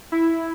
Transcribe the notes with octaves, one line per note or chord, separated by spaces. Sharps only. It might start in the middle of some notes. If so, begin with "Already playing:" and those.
E4